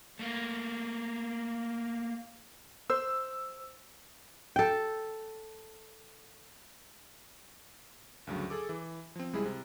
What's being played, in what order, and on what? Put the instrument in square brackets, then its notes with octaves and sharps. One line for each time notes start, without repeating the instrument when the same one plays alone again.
[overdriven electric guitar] A3 A#3
[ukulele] C5 [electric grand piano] E6
[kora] A4 G5
[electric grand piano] D2 G2 C#3 F#3
G#4 A4 D6
E3
F3 C4
C#2 G3 G#3 E4 G#4
C3